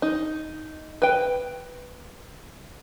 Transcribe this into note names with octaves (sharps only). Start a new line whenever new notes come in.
D#4
B4 G5